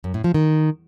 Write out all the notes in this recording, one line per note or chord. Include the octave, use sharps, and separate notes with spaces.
F#2
A2
F3
D#3